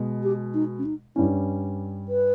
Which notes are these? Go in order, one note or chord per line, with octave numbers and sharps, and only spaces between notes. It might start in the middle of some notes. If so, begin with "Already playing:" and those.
Already playing: B2 G#3
G4
D#4
C#4
D#4
G2 G3 C#4 E4
B4